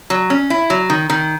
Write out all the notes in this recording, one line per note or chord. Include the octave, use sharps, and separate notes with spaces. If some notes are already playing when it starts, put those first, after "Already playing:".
F#3
C#4
E4
F#3
D#3
D#3